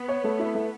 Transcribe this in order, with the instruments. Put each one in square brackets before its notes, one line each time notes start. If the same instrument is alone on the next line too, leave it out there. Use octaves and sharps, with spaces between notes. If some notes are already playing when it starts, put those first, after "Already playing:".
Already playing: [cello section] B3
[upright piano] C#5
A3
E4
A3